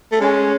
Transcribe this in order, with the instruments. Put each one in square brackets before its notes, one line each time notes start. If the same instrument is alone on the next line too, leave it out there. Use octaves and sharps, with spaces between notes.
[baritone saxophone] A3
[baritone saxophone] G#3 [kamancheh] C#4